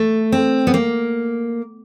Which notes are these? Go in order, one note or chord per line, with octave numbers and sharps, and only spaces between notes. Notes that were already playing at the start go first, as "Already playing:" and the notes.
Already playing: A3
C4
B3
A#3